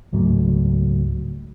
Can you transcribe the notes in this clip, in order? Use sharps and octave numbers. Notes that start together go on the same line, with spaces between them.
C#2 G#2 F#3 A3